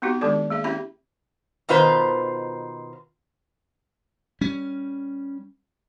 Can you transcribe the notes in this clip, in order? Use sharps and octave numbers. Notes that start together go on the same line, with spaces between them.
B3 C4 D#4 F#4 G4
D#3 G#3 D4 G4 A4 D5
A#3 G#4 E5
C4 C#4 E4 G4 E5 B5
B2 D#3 F4 B4 C5
G3 C#4